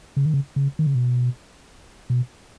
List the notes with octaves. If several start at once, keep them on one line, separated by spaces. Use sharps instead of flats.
C#3
D#3
C#3
C#3
D#3
C#3
B2
B2